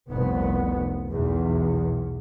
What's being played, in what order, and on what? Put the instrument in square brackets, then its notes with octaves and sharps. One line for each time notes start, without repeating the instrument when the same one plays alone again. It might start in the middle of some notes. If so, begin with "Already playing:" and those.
[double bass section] F1 C2 B3
B1 E2